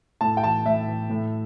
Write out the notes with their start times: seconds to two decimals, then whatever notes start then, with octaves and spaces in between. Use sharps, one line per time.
0.21 A2 A5
0.37 G5
0.44 E3 A5
0.66 A2 E5
0.88 E3
1.10 A2